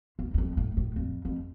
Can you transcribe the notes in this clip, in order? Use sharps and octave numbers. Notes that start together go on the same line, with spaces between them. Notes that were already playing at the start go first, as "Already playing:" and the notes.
E2
E2
F2
A2
A2
F2
F2